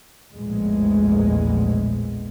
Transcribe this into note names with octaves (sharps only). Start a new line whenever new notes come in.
A#1 E2 A2 G#3